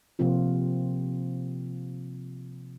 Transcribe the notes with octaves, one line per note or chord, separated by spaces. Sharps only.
C3 F3 A#3 C4 F4